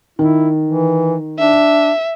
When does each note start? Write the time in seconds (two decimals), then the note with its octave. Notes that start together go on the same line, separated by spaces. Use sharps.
0.19 D#3 E4
0.66 E3
1.39 D4 E5